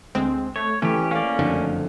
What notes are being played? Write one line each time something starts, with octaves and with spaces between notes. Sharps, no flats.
D2 G#3 C4
A3 C#5
E3 A3 C#4 G4
A#3 C#4 D5 F5
F#1 F2 D3